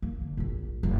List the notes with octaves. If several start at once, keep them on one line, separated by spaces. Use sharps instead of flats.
A#3
D3
A#1 F2
F1 G2